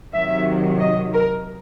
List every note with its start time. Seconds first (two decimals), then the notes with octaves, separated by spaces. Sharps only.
0.13 C3 D#3 F#3 E5
0.80 D#5
1.13 A#4